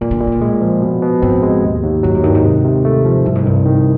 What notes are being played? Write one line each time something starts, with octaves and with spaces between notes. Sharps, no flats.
A#2 D#3
D3
A#2
C3
B2
A2 G#3
F3
B2
B2
G#2 C4
G#3
D#2
D#2
G2 F#3
F#2
G2 D#3
G#2
C3
C3
A3
F3
C2 G2
G#2
C2 G2
D#3